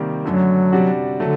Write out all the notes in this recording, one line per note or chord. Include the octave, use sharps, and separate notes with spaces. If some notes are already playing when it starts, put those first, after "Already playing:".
Already playing: C3 D#3 G3 A#3
F#2 D3 F#3 A3
C3 G3 D4 F#4
D3 F#3 A3